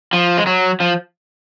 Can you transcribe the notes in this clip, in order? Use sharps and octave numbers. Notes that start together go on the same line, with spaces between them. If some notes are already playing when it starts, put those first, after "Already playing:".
F3
G#3
F#3
F3